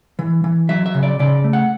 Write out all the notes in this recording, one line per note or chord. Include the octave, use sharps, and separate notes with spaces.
E3
E3
F#3 E5
E5
C#3
D5
C#3 D5
A3
F#5